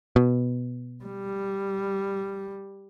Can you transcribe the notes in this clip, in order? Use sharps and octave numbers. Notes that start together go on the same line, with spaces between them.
B2
G3